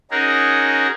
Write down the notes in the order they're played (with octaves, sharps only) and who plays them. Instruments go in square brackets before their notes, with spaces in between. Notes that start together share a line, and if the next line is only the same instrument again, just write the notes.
[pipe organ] C#4 D#4 F#4 G#4 A#4